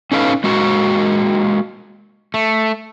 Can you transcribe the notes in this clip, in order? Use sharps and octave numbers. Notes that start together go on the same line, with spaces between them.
C#4 D#4 A4 B4 F5
G#3 A#3 F#4
A3